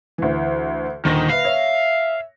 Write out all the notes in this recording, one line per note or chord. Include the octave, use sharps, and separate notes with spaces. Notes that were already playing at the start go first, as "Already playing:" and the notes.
D2 E3
D#1 D3 D#3 A#6
B4 E5 F5
C#5 E5